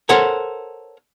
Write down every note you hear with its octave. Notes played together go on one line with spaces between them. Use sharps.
A4 A#4 C5 C#5 F#5 G#5